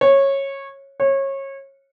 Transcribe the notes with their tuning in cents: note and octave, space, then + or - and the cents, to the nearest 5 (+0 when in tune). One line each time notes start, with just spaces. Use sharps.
C#5 -15
C#5 -25